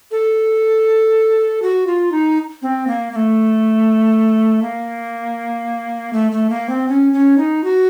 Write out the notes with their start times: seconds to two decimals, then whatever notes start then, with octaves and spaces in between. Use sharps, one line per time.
0.11 A4
1.62 F#4
1.87 F4
2.12 D#4
2.62 C4
2.87 A#3
3.12 A#3
3.16 A3
4.62 A#3
6.13 A3
6.32 A3
6.50 A#3
6.69 C4
6.88 C#4
7.13 C#4
7.38 D#4
7.64 F#4